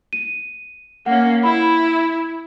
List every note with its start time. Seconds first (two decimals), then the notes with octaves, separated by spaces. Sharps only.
0.13 D#7
1.06 A#3 C#4 F#5
1.43 E4 B5